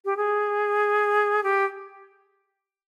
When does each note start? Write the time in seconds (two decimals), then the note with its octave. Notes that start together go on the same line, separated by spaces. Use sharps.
0.05 G4
0.17 G#4
1.43 G4